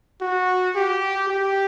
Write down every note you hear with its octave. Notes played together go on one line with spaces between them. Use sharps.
F#4
G4
G4